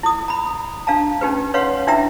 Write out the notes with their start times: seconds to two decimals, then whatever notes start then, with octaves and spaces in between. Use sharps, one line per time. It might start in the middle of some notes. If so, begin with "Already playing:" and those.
0.03 E4 D#6
0.28 A#5 B5
0.87 D4 F5 A5 A#5
1.21 C#4 D#4 G4 B4
1.54 B4 C#5 F5 F#5 C6
1.87 D4 E4 E5 G5 A#5 E6